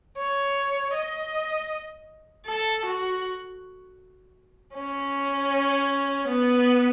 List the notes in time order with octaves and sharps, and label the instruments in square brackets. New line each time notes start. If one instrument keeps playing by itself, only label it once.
[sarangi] C#5
D#5
A4
F#4
C#4
B3